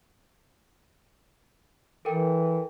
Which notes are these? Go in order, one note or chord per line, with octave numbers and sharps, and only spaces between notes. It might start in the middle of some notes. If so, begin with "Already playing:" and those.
E3 A4 A#4 G5